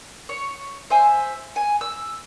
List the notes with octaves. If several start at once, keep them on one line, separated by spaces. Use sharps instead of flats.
C#5
C5 E5 G#5
G#5
E6